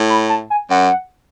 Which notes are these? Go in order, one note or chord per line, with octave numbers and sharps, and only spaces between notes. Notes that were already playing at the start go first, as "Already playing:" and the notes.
Already playing: A2
B5
A5
G#5
F#2 F#5